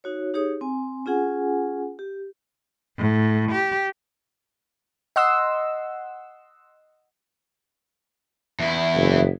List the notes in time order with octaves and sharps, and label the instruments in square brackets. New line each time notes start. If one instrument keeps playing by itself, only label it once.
[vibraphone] D#4 F#4 C#5
D#4 G4 G#4 C#5 D#6
C4 G#5
C#4 F4 G#4 F#5 G#5
G4
[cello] A2
G4
[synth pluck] D#5 F#5 C6 E6
[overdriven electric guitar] E2 E4
[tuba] F#1